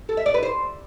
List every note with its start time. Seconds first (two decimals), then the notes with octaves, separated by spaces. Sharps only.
0.09 A4
0.17 E5
0.26 D5
0.34 B4
0.43 C5